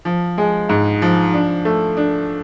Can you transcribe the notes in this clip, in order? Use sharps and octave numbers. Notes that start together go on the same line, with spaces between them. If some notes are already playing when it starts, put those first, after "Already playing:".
F3
G#3
G#2
F3
D4
A3
D4